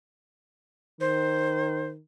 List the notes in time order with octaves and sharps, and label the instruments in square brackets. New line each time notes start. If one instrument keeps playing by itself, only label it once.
[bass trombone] D#3 [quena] C5